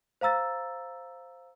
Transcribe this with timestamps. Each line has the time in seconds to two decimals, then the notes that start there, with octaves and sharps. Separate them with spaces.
0.21 C5 F5 A#5 E6 A6